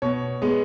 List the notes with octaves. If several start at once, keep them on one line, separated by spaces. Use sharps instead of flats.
B2 C#5
G#3 B3